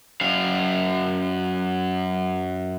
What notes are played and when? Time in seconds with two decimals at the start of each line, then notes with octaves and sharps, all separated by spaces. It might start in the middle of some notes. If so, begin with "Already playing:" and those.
0.21 F#2 F5